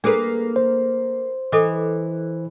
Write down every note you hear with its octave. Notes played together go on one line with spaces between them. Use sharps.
A#3 D4 G#4 A4 B4
C5
E3 A4 D#5 D6